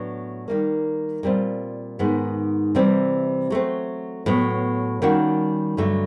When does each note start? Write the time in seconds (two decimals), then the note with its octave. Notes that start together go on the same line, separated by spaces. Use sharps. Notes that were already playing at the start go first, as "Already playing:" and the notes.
Already playing: A2 F#3 B3 D4
0.48 D#3 G3 A#3
1.23 A#2 G3 C4 F4
1.99 G#2 D#3 G#3 B3
2.75 C3 E3 G3 C4
3.50 F#3 A3 C4
4.26 A2 F#3 B3
5.02 D#3 G3 A#3 C#4 F#4
5.77 G2 D3 F#3 A3